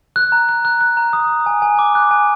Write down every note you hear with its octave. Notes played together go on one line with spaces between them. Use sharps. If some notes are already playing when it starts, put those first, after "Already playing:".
F#6
A#5
F#6
F#6
F#6
A#5
D#6
D#6
G#5
G#5
D6
F#6
G#5